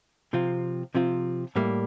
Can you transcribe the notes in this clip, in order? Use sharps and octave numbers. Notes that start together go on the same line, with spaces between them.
C3 F3 C4 F4
C3 F3 C4 F4
A2 G3 A#3